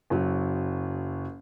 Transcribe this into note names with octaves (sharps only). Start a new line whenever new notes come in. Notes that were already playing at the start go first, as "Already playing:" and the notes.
F#1 F#3